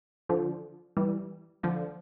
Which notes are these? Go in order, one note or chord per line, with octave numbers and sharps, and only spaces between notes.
D3 F3
E3 G3
D3 F3